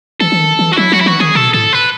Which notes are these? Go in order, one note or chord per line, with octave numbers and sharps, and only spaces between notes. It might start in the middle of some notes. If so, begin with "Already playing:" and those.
E3 A4
E3
D#3
E3
F#4
F#3 E4
F#3 F#4
E4
E3 F#4
D#3 G#4
B2 A4
A2 A4
B4